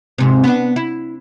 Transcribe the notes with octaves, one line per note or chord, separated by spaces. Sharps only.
G#2 C3
B3 D4
E4